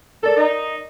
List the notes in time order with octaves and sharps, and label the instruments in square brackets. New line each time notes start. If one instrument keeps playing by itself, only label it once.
[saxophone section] A4 [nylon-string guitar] A#4 D5
[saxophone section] D#4